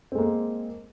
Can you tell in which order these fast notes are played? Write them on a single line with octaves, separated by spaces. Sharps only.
C4 G#3 A#3